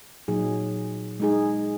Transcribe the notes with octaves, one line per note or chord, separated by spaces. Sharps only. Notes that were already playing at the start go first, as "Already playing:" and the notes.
A#2 F#3 D#4 G#4
G#3 D#4 G#4